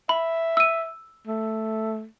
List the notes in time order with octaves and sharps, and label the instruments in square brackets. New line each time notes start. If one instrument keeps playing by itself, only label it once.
[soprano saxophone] E5 [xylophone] B5
[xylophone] E6 D#7
[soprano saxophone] A3